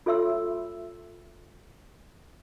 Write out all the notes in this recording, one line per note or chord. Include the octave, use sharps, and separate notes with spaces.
F4 A4 C#5 E5 C6 E6